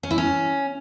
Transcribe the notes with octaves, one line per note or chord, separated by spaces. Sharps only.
C#4
E4
C#4